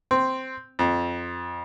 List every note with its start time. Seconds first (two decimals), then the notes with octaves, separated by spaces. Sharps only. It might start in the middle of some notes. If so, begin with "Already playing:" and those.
0.11 C4
0.79 F2